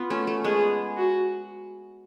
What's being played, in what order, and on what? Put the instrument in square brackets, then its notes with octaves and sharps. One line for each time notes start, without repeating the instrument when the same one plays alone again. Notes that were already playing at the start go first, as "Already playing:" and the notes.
Already playing: [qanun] B3 F4
A3 C#4
A3
[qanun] G#3 B3 [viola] G#4
[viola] F#4